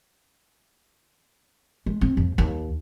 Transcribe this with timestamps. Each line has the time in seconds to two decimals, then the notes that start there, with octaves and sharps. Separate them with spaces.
1.86 G#3
2.01 C4
2.17 F2
2.38 D#2